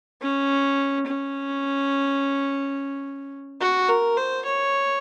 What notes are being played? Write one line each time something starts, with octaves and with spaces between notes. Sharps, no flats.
C#4
C#4
F#4
A#4
C5
C#5